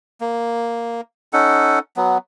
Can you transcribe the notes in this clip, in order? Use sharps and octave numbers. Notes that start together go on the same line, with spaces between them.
A#3
C#4 D#4 A4 F#5
F#3 B3